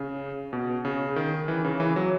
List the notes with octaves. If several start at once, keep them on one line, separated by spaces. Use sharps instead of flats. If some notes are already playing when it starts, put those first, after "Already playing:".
Already playing: C#3
B2
C#3
D#3
E3
C#3
E3
F#3